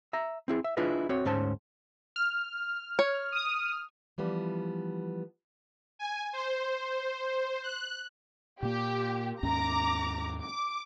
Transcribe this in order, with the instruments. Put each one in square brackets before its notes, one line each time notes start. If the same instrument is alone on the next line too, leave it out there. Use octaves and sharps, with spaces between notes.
[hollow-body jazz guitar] E5 A#5
C4 E4 G#4
E5
D4 E4 F4 G#4 B4 D#5
C4 F#4 C#5
D2 G#2 C#4 C5 A5
[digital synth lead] F6
[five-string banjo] C#5
[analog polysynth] D#6
[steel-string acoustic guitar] E3 F3 G3 B3
[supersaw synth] G#5
C5
F#6
[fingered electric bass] A#2 A#3 [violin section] G4
[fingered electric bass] D#2 G#2 C#4 [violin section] A#5 D6
[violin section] D6